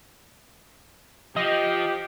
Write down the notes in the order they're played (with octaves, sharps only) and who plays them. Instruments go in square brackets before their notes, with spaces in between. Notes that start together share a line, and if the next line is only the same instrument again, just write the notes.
[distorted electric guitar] F3 [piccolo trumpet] G4 [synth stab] D#5